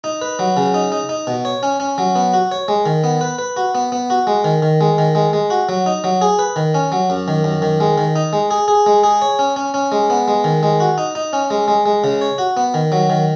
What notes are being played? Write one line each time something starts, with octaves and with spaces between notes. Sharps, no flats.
D#4
B4
F#3
C#3
D#4
D#4
D#4
B2
C#5
C#4
C#4
F#3
B3
F#4
C#5
G#3
D#3
B3
B4
B4
F#4
B3
B3
F#4
G#3
D#3
D#3
G#3
D#3
G#3
G#3
F#4
F#3
D#4
F#3
G#4
B4
D#3
C#4
F#3
F#2
D#3
F#2
D#3
G#3
D#3
D#4
G#3
G#4
G#4
G#3
G#4
C#5
C#4
C#4
C#4
G#3
B3
G#3
D#3
G#3
F#4
D#4
D#4
C#4
G#3
G#3
G#3
C#3
C#5
F#4
B3
D#3
F#3
D#3